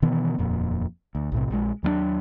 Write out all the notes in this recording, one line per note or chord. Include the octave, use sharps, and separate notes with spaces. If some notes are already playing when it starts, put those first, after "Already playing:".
B2 D#3 E3 B3
D#1 F2 A#2
D2
B1 A2 C3
A#1 F#3 G#3
D#2 F#3 A#3 D4